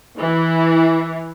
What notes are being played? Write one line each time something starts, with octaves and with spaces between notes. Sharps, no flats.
E3